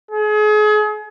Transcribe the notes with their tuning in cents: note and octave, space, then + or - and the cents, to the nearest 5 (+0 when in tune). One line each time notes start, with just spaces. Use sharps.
G#4 +35